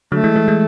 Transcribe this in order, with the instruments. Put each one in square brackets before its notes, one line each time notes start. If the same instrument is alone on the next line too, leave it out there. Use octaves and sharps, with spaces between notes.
[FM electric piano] D3 F#3 [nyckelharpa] A3
[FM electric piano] E3 G#3
E3 G#3
E3 G#3